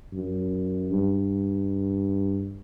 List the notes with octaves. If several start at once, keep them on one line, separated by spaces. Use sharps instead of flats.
F#2
G2